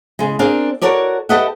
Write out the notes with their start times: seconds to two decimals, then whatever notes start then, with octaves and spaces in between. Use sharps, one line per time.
0.19 C#3 G#3
0.39 C4 D4 G#4 A#4 F5
0.82 F#4 A4 A#4 C#5 D5
1.29 G4 A4 B4 D#5 E5 F#5